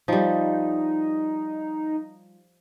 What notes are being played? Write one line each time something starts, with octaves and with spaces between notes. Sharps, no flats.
F3 G3 D#4